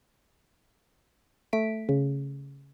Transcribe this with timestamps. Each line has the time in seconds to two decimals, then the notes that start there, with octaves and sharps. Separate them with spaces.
1.53 A3 B6 D7
1.89 C#3